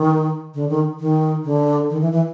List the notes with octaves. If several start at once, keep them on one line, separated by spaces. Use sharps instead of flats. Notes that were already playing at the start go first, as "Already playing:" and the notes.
Already playing: D#3
D3
D#3
D#3
D3
D#3
E3
E3